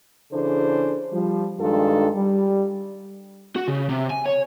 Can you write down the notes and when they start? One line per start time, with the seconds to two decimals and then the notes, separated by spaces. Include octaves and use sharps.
0.32 C#3 E3 D4 G#4 A4 C5
1.12 F3 G3
1.60 G2 D#3 G#3 D4 F4 A4
2.14 G3
3.56 F#4
3.68 C#3
3.89 C3
4.10 G#5
4.26 C#5